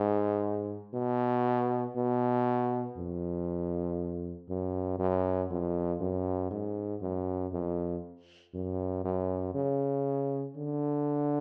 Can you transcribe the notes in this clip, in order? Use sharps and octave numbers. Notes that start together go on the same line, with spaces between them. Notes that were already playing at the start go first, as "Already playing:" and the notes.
Already playing: G#2
B2
B2
F2
F#2
F#2
F2
F#2
G#2
F#2
F2
F#2
F#2
C#3
D3